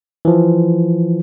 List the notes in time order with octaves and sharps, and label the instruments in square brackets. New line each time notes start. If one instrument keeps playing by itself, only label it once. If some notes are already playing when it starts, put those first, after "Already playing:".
[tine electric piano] E3 F3